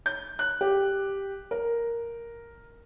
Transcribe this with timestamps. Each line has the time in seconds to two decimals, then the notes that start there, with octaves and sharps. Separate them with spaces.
0.06 G6
0.39 F#6
0.61 G4
1.51 A#4